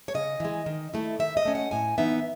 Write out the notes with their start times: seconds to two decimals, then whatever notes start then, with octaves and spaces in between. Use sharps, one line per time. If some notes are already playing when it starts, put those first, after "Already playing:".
0.08 C#5
0.14 C#3 D#5
0.40 E3 G#3
0.66 D#3
0.94 A3 E4
1.19 D#3 E5
1.37 D#5
1.45 A3 C#4
1.55 F#5
1.71 A2 G#5
1.98 E3 B3 D#4 E5